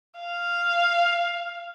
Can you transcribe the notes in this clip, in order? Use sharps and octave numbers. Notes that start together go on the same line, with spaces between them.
F5